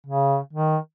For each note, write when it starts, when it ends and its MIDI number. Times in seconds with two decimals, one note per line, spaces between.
0.07 0.38 49
0.53 0.77 51